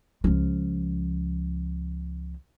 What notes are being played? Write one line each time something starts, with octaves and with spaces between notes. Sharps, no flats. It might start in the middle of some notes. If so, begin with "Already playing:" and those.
C#2 F3